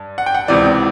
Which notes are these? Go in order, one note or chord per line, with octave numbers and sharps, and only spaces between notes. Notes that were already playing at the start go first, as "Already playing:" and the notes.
Already playing: G2
F#5
G5
F#5
C#2 C3 E3 D5